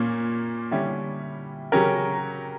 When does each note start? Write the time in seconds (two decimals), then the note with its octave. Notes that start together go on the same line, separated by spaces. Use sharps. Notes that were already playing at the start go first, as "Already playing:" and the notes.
Already playing: A#2 A#3 C#4
0.71 D3 G3 C#4 E4 G4
1.72 C#3 F#3 C#4 G4 A#4